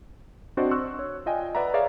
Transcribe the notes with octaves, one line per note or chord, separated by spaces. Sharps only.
C4 D4 F#4 C5 D5 D#5
C6 C#6 E6 F#6
C#5
F4 D5 D#5 G5 G#5
B4 D5 E5 F#5 A#5
G#4 C#5 D5 E5 F5 A#5